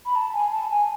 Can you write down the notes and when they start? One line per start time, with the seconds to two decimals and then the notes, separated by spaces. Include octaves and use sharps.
0.06 B5
0.16 A5
0.33 G#5
0.52 A5
0.71 G#5